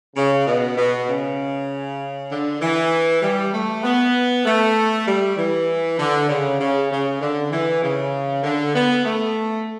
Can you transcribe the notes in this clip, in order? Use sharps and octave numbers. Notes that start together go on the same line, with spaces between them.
C#3
B2
B2
C#3
D3
E3
G3
A3
B3
A3
G3
E3
D3
C#3
C#3
C#3
D3
E3
C#3
D3
B3
A3